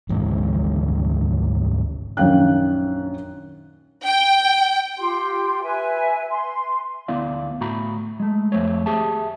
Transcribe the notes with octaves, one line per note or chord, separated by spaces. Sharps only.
G#1 D2 G#2 E3
A#1 F#2 D#3 F5 G5 F#6
G5
F4 G4 C6
B4 E5 G#5
C6
D2 B3 E4 D5 F5
A2 F#4 A#5 B5
G#3 A3
F2 A3 C5 C#5
G4 G#4 E5 A5